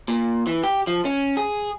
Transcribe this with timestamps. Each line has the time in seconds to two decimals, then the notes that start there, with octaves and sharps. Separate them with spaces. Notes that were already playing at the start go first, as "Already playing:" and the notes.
0.08 A#2
0.47 E3
0.64 G4
0.87 F3
1.05 C#4
1.37 G#4